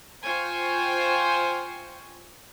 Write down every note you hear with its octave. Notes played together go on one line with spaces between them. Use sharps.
F4 C5 G5 G#5 C#6